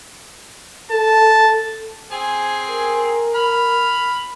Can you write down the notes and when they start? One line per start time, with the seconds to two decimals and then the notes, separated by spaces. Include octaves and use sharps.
0.91 A4 A5
2.12 C4 G#4 G#5
2.70 A#4
3.35 B5 F6